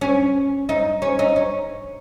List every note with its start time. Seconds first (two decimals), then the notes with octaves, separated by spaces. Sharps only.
0.01 C#4
0.69 D#4
1.02 C#4
1.19 D#4
1.36 C#4